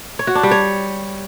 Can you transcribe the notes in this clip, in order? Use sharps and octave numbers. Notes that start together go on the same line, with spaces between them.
C#5
F#4
D4
G3
C#5